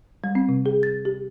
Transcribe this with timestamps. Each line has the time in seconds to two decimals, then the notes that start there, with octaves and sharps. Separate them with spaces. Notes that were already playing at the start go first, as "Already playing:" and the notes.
0.24 G3
0.35 C4
0.49 C3
0.66 G#4
0.83 A6
1.05 G4